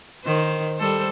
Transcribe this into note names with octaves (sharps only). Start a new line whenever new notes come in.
D#3 C5
G3 A4 C5